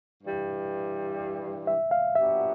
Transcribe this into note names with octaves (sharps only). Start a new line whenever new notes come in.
G2 E3 G3
E5
F5
A#2 F#3 B3 D4 G4 E5